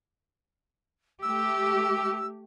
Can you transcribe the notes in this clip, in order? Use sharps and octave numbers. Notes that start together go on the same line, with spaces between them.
A3 G4 E6